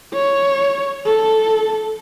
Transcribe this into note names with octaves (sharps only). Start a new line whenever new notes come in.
C#5
A4